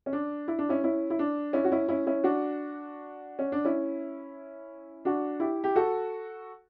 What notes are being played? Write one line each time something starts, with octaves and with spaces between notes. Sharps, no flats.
C#4
D4
E4
D4
C#4 E4
C#4 E4
E4
D4
C#4 E4
F#4
C#4 E4
C#4 E4
C#4 E4
D4 F#4
C#4
D4
C#4 E4
D4 F#4
E4 G4
G4
F#4 A4